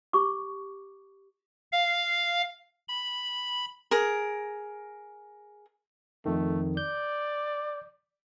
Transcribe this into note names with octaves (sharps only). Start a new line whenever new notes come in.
G4 C#6 D6
F5
B5
G#4 A#4
F2 D#3 A3
D5 G6